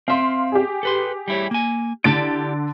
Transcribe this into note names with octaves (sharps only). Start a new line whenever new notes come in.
C4 E5 F5 C6
G4 G#4
A4 B4 C6
G3 E4 C#5
A#3 G#5
D3 E4 G4 A5 A6 D7